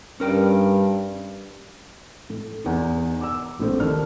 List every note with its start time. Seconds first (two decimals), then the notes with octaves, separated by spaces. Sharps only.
0.20 G2 C#4 A#4 G5
2.30 A2
2.64 E2 D#4
3.21 D6 E6
3.59 A#1 A2 C4
3.80 D#2 D#3 D4 F6